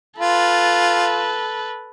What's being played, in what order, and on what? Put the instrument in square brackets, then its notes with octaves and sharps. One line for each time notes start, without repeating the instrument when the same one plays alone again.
[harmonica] F4 [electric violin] A4 B4